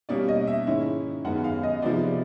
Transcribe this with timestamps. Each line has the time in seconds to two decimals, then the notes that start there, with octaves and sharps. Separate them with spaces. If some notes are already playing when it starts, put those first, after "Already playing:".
0.09 B2 G3 A#3 C#4 D5
0.29 D#5
0.47 E5
0.66 G#2 D#3 G#3 C#4 E4
1.25 F#2 D#3 G#3 B3 F#5
1.44 F5
1.63 D#5
1.82 C3 F3 G#3 B3 D#4 D5